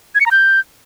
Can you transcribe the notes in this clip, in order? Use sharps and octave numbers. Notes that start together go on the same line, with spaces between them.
G#6
C#7
A#5
G6